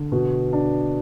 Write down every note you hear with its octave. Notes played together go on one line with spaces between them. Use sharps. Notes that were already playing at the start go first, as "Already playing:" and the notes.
Already playing: D3
B2
D4